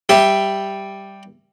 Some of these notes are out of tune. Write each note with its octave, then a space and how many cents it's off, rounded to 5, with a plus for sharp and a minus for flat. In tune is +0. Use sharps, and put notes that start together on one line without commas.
G3 +0 G4 +0 E5 +0